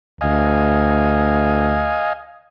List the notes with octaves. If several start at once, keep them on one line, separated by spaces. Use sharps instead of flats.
D2 D#5 F5 G#5